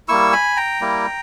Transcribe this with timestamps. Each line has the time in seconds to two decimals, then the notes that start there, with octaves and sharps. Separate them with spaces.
0.08 G3 A#3 E4 C#6 E6
0.33 G#5 B5
0.57 G5 A#5
0.81 G3 A#3 E4